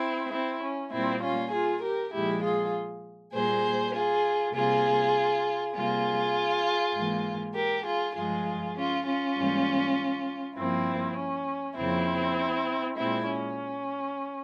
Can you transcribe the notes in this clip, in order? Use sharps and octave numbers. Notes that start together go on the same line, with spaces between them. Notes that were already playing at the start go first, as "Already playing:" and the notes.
Already playing: C4 E4
C4 E4
C#4
A#2 G3 A#3 C4 E4
C#4 F4
F4 G#4
G4 A#4
A#2 F3 G#3 E4 G4
F4 G#4
A#2 G3 A#3 G#4 C5
F4 G#4
C3 G3 A#3 F4 G#4
C3 G3 A#3 F4 G#4
G#2 E3 A#3
G4 A#4
F4 G#4
G2 F3 G#3 F4 G#4
C#4 F4
C#4 F4
G#2 E3 G3 A#3
G2 F3 A#3 C4 E4
C#4
F2 C#3 F3 A#3 C4 E4
A#2 G#3 C4 E4
C#4